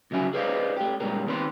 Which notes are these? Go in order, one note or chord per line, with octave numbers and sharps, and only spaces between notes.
D2 C#3 F#3 E5 G#5
G#4 B4 C5 D5 D#5 F5
A3 G4
A#2 G3 G#3 A#3
D#3 B3 C4 E5 C6